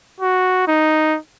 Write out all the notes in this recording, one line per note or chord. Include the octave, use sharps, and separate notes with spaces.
F#4
D#4